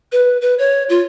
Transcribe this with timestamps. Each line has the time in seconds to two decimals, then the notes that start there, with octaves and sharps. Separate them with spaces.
0.12 B4
0.41 B4
0.59 C#5
0.89 F4